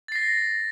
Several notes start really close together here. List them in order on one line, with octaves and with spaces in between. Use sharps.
A6 C7 A#6